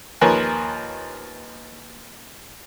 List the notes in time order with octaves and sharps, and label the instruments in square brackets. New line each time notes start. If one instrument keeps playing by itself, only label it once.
[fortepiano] D#2 F3 A#4 B4 C#5 G#5